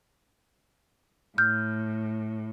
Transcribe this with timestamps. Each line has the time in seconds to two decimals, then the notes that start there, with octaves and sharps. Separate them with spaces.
1.38 A2 F6 G6